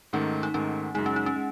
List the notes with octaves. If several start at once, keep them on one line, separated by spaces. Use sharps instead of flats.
G#2 D#3 A3 C#4
D#4
G#2 D#3 A3 C#4
F#2 C#3 G#3 D#4
C#4
D#4
C#4
G#3